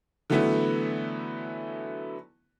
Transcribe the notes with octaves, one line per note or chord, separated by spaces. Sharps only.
D3 E3 F#3 A3 B3 E4